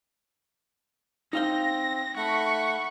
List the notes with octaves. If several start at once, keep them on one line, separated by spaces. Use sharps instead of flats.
C4 D#4 F5 G5 A#6
A3 F#5 B5 C#6